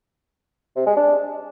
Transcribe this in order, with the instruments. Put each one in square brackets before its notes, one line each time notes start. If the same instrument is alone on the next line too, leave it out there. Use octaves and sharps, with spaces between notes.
[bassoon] C3
G#3
D4